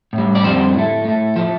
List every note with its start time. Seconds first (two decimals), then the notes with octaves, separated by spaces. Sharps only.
0.13 A2
0.18 G3
0.35 D5
0.44 F2 D3 G3 C5
0.74 A2 A3
1.05 A2 A3
1.36 F3 A3 C5